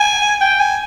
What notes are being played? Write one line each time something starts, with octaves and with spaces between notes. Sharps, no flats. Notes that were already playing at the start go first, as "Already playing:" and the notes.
Already playing: G#5
G5
G#5